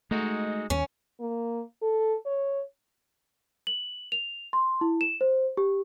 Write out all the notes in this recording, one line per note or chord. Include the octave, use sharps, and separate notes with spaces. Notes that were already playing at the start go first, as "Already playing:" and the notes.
G#3 A3 D#4 F#4
D#2 C#4
A#3
A4
C#5
F#7
F7
C6
E4
E7
C5
G4